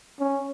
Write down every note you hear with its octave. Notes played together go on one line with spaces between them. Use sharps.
C#4